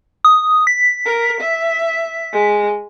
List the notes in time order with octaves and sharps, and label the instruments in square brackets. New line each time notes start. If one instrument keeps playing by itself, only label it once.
[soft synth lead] D#6
B6
[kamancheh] A#4
E5
G#3